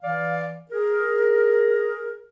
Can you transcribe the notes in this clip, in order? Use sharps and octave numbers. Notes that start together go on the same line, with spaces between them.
E3 D5 F5
G#4 A#4